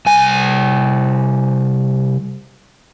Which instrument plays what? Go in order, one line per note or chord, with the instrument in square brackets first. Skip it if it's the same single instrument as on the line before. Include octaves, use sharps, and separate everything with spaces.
[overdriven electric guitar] C2 G#5